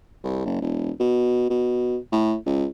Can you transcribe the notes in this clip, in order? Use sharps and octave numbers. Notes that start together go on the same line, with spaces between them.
C2
F#1
E1
B2
B2
A2
C#2